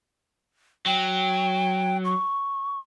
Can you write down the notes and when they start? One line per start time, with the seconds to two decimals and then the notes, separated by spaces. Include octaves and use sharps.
0.86 F#3 G5
2.04 C#6